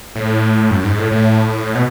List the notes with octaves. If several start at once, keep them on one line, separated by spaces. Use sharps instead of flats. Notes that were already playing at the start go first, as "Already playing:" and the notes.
A2
F#2
G#2
A2
A2
B2